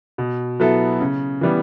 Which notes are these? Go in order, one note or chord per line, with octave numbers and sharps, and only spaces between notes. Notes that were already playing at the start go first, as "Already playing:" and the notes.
B2
F#3 B3 E4 A4
C#3
E3 G3 B3